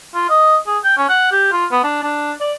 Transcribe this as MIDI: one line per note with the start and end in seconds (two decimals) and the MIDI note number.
0.15 0.26 65
0.30 0.57 75
0.67 0.78 68
0.84 0.95 79
0.98 1.08 61
1.09 1.29 78
1.32 1.51 67
1.53 1.66 65
1.72 1.80 59
1.84 1.99 62
2.03 2.33 62
2.41 2.54 74